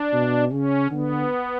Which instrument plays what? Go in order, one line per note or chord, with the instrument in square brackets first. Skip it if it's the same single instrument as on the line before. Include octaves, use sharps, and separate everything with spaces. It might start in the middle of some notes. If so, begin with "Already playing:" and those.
Already playing: [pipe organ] D4
[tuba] B2
[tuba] C#3 [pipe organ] C#4
[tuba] D3 [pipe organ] B3